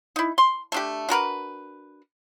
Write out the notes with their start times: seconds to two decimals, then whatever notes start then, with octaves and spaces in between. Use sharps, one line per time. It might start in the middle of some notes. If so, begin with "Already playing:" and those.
0.16 D#4 E4
0.38 C6
0.72 A3 D4 G4
1.09 D4 F#4 A#4 B4